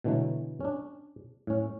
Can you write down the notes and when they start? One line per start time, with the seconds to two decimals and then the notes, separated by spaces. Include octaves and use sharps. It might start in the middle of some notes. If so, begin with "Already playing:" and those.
0.04 B2 D3 E3 F#3 A3
0.60 C#4 D4
1.47 A2 C#4